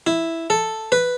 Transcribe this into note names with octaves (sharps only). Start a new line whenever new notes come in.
E4
A4
B4